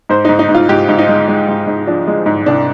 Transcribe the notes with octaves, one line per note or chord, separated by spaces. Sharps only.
G#2 C5
G#2 D#4
D#4
G#2
F4
G#2 G4
G#2
D#4
G#3
G#3
G#2
G#2
F3 D4
G#3
G#2
C2 D4